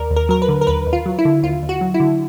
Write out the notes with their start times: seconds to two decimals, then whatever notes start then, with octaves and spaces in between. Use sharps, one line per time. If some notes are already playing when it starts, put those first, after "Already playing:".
Already playing: D#2 A#4 D5
0.10 D#2
0.16 A#4
0.29 F#3 A#4
0.42 B4
0.49 D3
0.61 A#4
0.67 D#2 B4
0.87 D#2
0.93 F4
1.06 F#3
1.19 E4
1.25 D3
1.43 D#2 F4
1.63 D#2
1.69 F#4
1.81 F#3
1.94 E4
2.00 D3